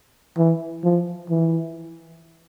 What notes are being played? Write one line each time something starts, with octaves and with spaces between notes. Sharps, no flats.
E3
F3
E3